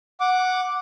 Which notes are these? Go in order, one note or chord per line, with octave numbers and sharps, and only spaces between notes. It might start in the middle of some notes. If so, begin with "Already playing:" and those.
F#5 D6